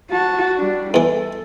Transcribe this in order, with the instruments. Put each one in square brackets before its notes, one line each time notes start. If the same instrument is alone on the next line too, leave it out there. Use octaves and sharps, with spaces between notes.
[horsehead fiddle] F#4 A5
G3 D4
[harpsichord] E2 E3 [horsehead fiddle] A4